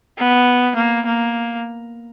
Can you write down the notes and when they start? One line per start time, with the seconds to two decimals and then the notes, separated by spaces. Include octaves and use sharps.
0.19 B3
0.76 A#3
1.06 A#3